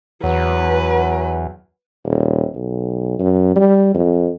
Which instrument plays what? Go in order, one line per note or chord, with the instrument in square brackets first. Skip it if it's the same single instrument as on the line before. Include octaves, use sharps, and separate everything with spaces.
[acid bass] E2 [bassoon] F#3 [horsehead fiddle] B4
[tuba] D#1
B1
F#2
G3
F2